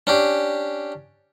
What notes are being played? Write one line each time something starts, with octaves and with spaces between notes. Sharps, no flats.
C#4 D4 G4